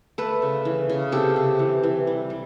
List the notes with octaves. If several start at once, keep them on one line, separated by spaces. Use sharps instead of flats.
A3 A4 B4
C#3
E3
C#3
C3 G4 A4
C3
E3
E3
G3
G3